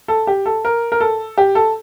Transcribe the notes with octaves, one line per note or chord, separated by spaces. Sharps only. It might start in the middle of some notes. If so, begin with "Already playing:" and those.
A4
G4
A4
A#4
A#4
A4
G4
A4